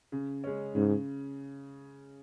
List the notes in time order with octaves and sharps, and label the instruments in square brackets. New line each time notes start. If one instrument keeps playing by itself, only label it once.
[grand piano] C#3
G#3 C#4
[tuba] G#2 [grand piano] C#3